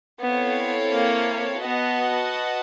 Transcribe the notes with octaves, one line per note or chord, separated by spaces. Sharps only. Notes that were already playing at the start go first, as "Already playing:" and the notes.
B3 C4 E4 A4 C#5 F5
A#3
B3 F#4 B4 D#5 F#5 A5